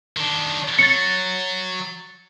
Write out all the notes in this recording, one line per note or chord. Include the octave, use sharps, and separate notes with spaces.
D#3 D4
F#3 A6 C#7